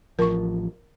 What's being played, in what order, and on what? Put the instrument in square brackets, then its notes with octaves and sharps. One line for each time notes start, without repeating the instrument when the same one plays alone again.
[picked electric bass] A1 F3 [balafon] A#4 C#6